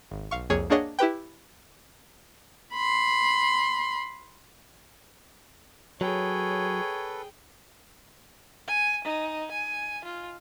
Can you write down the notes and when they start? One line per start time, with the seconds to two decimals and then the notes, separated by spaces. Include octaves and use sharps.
0.11 G#1
0.31 B1 F5 C#6
0.50 C2 F2 A#3 G#4 C#5
0.70 A#3 D4 G#4 C#5 D#5 F#5
0.99 E4 G4 B4 G5
2.74 B5 C6
6.01 F#3 G#4 A4 B4 C#5 G5
8.68 G#5
9.05 D#4
9.52 G#5
10.05 F4